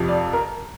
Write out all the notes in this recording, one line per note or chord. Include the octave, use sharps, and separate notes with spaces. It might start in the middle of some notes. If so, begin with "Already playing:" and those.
Already playing: F2 C3 F3
D5
A#4